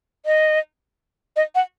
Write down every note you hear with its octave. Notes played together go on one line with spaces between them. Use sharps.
D#5
D#5
F#5